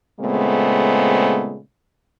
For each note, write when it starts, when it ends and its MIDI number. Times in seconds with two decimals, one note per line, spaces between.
0.21 1.59 46
0.21 1.59 49
0.21 1.59 56
0.21 1.59 57
0.21 1.59 59
0.21 1.59 60